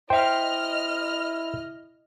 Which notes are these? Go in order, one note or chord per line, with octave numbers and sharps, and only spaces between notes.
E4 C5 D#5 E5 G5 F6